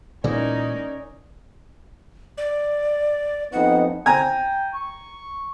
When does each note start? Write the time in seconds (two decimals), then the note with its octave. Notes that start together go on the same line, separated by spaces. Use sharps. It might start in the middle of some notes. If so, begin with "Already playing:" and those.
0.24 A#2 E3 G#3 C#4 D#4 A#4 D5
2.38 D5
3.53 F2 B3 D#4 F#5
4.06 G5 G#5 A#5
4.74 C#6